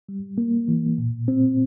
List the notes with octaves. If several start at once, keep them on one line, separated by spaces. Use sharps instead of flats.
G3
A#3
E3
A#2
C4